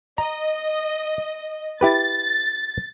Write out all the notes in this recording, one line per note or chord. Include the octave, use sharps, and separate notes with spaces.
D#5 A#5
E4 G4 B4 A6